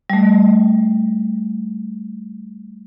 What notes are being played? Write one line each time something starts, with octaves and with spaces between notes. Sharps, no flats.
G3 A3